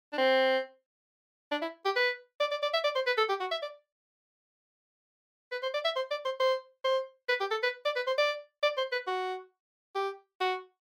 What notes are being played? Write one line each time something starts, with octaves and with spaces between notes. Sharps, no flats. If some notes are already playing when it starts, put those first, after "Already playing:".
D4
C4
D4
E4
G4
B4
D5
D5
D5
E5
D5
C5
B4
A4
G4
F#4
E5
D5
B4
C5
D5
E5
C5
D5
C5
C5
C5
B4
G4
A4
B4
D5
B4
C5
D5
D5
C5
B4
F#4
G4
F#4